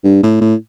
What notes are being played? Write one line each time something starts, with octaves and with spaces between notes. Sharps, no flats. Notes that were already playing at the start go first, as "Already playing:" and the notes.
G2
A2
A2